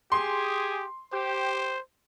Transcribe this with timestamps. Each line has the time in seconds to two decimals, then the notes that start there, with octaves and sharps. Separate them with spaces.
0.12 G4 G#4 C6
1.13 G4 C5